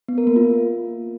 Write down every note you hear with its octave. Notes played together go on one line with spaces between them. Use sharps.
B3
A#4
A#3
F4